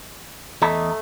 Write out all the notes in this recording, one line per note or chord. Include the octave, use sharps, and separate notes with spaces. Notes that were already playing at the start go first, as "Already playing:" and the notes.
E2 A3 D#5 A#5